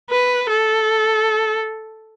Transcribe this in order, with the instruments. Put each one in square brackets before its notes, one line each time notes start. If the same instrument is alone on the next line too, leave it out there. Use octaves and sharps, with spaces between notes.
[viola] B4
A4